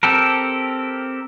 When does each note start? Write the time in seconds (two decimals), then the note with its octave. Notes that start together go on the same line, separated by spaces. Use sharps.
0.03 C4 G4 A4 A#4